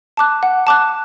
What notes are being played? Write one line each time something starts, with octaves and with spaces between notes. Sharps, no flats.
A5 D6 F#6
F#5
A5 D6 F#6